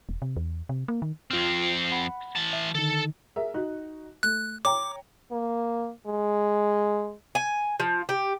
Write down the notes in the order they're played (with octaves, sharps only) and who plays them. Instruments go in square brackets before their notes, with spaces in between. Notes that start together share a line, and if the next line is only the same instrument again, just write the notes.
[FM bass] E1
C3
E2
C3
A#3
D#3
[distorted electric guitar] F2 C4 [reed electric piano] F4 F6
[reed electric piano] F#5 B5
[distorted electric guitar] E3 A5
[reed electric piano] E5
[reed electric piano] D3 D#3 D#4 [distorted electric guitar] A4
[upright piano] G#4 A#4 E5
D#4 F#4 F#6
[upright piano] A3 [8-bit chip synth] F#6
[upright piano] C#5 G5 A#5 [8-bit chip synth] D6
[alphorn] A#3
G#3
[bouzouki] G#5
F3
G4